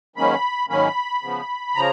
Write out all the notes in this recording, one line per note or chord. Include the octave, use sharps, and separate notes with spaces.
G#2 D#3 F#3 A#3 C#4 B5
G#2 D#3 F#3 A#3 C#4 B5
C#3 F3 B3
C#3 F3 A#5